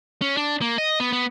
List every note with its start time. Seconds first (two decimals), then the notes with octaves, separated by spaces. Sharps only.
0.22 C#4
0.37 D4
0.62 A#3
0.78 D#5
1.00 B3
1.13 B3